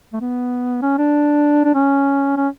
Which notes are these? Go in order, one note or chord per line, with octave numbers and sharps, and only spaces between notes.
A3
B3
C#4
D4
D4
C#4
C#4